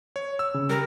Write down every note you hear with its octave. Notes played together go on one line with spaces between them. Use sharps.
C#5
E6
C#3
G3 A#4